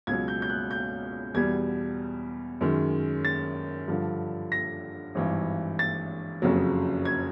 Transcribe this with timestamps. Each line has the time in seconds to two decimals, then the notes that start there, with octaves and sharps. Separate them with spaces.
0.07 C#2 B2 F#3 G#6
0.28 G6
0.42 G6
0.49 F#6
0.71 G6
1.34 E2 B2 G3 G#6
2.61 F#2 D#3 G#3
3.25 A6
3.88 G2 D3 F3
4.52 A#6
5.15 G#1 G2 E3
5.79 A6
6.42 F#1 F2 C#3 F#3
7.05 G#6